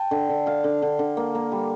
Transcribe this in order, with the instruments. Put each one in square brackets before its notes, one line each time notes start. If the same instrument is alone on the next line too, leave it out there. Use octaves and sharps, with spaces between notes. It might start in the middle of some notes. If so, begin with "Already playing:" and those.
Already playing: [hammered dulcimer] G5 A5
D3
D3
D3 F5
D3
D3
D3
A#3
A#3
G3